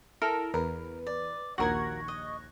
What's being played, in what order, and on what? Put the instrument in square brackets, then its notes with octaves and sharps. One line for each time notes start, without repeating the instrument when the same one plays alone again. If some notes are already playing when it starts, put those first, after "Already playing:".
[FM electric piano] E4 [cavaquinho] A4 [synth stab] A#4
[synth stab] E2 [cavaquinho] A#4 [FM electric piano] B4
[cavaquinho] D5
[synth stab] A#1 D#2 G#6 [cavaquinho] F#4 A#4 [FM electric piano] C#6 F#6 A#6
[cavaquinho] D#5